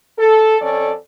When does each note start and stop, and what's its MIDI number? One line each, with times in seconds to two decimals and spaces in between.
0.19 0.56 69
0.61 0.92 41
0.61 0.92 61
0.61 0.92 69
0.61 0.92 74